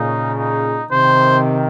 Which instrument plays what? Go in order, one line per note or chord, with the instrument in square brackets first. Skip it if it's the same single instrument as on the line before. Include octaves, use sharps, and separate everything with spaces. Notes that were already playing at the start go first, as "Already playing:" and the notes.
Already playing: [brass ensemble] A#2 C#3 [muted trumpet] D#4
[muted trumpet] D#4
[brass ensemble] C3 D#3 [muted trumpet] C5